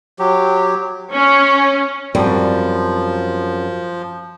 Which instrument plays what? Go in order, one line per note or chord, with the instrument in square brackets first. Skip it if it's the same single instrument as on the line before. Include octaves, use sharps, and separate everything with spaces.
[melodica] F#3 G4
[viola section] C#4
[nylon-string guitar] F#2 G3 C4 [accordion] F3